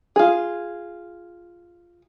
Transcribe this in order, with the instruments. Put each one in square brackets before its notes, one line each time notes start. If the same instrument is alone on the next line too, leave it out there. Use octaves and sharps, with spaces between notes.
[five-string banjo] F4 G#4